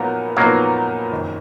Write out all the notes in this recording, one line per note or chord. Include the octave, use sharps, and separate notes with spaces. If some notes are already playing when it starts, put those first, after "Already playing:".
Already playing: A#2 F3 F#3 A#3 B3 D#4 A#4
A#2 F3 F#3 A#3 B3 D#4 A#4
F#1 F2 D#3